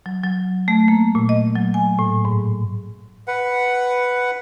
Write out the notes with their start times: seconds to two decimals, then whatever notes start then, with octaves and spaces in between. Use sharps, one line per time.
0.06 F#3
0.24 F#3
0.68 A3
0.88 A#3
1.15 A#2
1.29 D#5
1.56 F#3
1.74 G#5
1.99 A2
2.25 G#2
3.28 B4 F#5